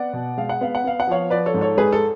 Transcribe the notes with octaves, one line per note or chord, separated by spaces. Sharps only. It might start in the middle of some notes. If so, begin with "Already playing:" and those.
Already playing: B3 D5 F#5
B2
G#3 F5
F#5
B3 F5
F#5
B3 F5
F#5
F3 C#5 F5
F3 B4 D5
A4 C#5
G#2
A4 C#5
G#3 G#4 B4
A4